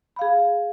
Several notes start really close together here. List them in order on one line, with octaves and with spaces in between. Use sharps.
B5 F5 G#4